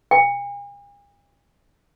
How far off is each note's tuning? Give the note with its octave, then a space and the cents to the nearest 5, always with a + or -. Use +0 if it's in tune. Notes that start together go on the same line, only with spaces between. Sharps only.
G#5 -45